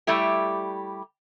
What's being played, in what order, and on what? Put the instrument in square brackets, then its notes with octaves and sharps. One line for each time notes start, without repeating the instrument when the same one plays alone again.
[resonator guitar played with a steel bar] G3 A3 E4 G4